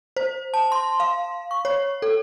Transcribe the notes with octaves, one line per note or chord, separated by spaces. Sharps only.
C5
A5
C6
F5
C#6
C#5
A4